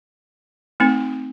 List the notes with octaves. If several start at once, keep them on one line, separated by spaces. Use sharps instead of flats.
A3 C4 D#4